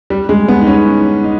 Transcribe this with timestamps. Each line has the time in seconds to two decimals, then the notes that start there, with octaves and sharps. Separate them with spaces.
0.10 G3
0.29 G#3
0.48 B3
0.61 D#4
0.67 C#4
0.87 D#4
1.24 D#4